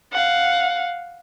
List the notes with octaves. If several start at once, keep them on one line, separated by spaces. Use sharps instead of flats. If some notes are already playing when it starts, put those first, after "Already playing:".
F5 F#5